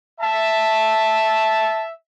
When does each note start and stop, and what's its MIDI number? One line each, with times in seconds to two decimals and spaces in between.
0.20 1.84 76
0.20 1.84 81